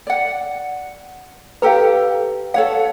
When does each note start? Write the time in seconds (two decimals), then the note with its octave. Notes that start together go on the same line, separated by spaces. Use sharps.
0.07 D5 F#5
1.62 G4 A4 B4 F5 A#5
2.54 A4 C#5 F5 F#5